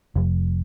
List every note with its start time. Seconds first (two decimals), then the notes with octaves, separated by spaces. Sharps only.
0.16 F1